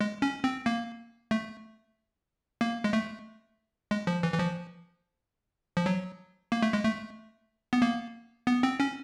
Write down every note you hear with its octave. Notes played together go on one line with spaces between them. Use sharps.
G#3
C#4
C4
A#3
A3
A#3
G#3
A3
G#3
F3
E3
E3
F3
F3
F#3
A#3
A3
G#3
A3
B3
A#3
B3
C4
C#4